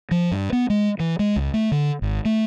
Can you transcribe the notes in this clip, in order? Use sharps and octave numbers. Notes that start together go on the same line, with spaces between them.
F3
G2
B3
G#3
E3
G#3
C#2
A3
D3
G#1
A3